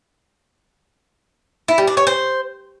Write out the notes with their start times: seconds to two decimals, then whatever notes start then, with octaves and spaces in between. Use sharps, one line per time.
1.68 E4
1.78 G3
1.87 D4
1.97 C#5
2.07 C5